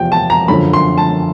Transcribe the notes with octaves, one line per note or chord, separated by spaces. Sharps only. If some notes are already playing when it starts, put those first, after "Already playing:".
Already playing: E2 C3 F3 G5
A5
A#5
F#2 D3 F3 B5
C6
A5